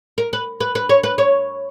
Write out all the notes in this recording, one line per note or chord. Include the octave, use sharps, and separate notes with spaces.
A#4
B4
B4
B4
C#5
B4
C#5